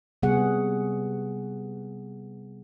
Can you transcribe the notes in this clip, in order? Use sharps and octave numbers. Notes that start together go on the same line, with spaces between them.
C3 G3 B3 G#4 F#5